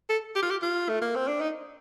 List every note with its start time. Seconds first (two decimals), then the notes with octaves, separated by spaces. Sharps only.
0.10 A4
0.36 G4
0.43 F4
0.51 G4
0.63 F4
0.89 A3
1.02 A#3
1.16 C4
1.28 D4
1.41 D#4